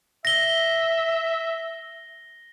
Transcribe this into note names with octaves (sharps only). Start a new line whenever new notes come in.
E5 A#6 G7